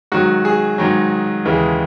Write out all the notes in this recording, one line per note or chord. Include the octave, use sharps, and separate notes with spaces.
G#2 D#3 F#3 F#4
G#4
G#2 D#3 F#3
D#2 C#3 E3 G#3